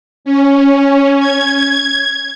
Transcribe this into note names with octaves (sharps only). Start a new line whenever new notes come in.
C#4
G#6